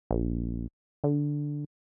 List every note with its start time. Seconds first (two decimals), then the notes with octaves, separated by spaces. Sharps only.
0.11 A#1
1.04 D3